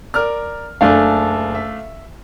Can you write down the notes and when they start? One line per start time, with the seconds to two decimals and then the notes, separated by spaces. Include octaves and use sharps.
0.14 A#4 D5 F6
0.81 F#1 A3 D4 F5 G#5
1.55 E5